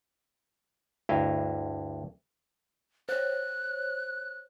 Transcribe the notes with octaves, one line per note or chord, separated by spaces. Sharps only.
D2 G2 E4 D#5 F5
C5 C#5 F#6